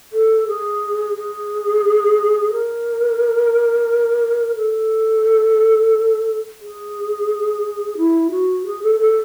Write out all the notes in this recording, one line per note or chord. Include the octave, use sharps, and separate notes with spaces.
A4
G#4
G#4
A#4
A4
G#4
E4
F#4
G#4
A4
A4